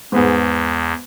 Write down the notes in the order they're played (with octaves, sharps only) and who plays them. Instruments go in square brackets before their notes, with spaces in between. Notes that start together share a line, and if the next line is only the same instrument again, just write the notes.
[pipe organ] E2 [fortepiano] G#2 B3 G#4